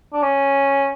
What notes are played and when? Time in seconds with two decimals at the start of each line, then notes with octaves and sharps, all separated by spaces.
0.14 D4
0.23 C#4